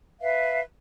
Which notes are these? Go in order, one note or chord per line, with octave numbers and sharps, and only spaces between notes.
B4 E5 F5